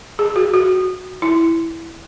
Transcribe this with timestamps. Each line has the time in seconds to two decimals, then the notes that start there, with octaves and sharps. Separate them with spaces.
0.19 G#4
0.36 F#4
0.54 F#4
1.22 E4